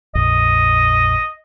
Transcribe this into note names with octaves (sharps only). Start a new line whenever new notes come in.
A#1 F2 D#5